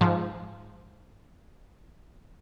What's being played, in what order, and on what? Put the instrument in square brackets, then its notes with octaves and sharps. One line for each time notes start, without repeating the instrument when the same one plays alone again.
[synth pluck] G#2 F3